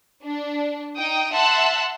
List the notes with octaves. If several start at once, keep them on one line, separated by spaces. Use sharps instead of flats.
D4
D#4 G5 D#6
E5 F#5 A5 C6 E6 F#6